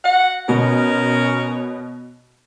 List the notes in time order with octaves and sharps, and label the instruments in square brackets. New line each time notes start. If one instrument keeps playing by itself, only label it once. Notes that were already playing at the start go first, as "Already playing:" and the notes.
[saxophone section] F#4 F#5
[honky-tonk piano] B2 [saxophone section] C#4 A#4 C#5